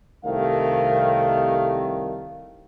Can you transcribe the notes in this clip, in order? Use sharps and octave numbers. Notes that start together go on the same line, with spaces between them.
C2 D#3 A3 F5